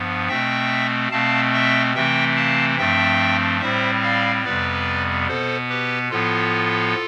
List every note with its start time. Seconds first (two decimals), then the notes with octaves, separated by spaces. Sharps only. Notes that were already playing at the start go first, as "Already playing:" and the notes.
Already playing: G2 F3 B3
0.28 B2 A3 C4 E5 G5
1.12 B2 A3 C4 F5 A5
1.53 E5 G5
1.95 C3 E3 A3 C4 E5 G5
2.36 F5 A5
2.78 G2 F3 A3 C4 E5 G5
3.61 A2 G3 C4 C5 E5
4.03 D5 F5
4.44 F2 C3 G3 B3 B4 D5
5.28 B2 B3 A4 C5
5.70 G4 B4
6.11 A2 F3 B3 F4 A4